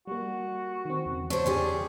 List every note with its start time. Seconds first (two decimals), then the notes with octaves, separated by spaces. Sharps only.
0.07 G3 A#3 F#4
0.85 D#3 C4
1.06 E2 C#3
1.30 D4 C5 C#5
1.46 C#4 G4 G#4 D5 A5 C6